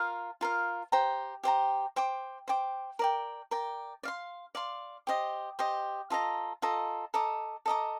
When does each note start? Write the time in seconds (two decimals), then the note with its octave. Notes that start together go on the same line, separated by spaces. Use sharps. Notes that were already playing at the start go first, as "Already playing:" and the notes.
Already playing: F4 A#4 F5
0.41 F4 A#4 F5
0.92 G4 C5 G5 A#5
1.43 G4 C5 G5 A#5
1.96 C5 G5 D6
2.48 C5 G5 D6
2.99 A#4 D5 G5
3.51 A#4 D5 G5
4.03 D5 F5 C6
4.55 D5 F5 C6
5.07 G4 C5 D#5
5.59 G4 C5 D#5
6.10 F4 A4 D#5 A#5
6.62 F4 A4 D#5 A#5
7.14 A4 D#5 A#5 D6
7.66 A4 D#5 A#5 D6